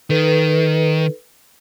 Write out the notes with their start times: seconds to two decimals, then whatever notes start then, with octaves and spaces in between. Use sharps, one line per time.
0.10 D#3 A4 B4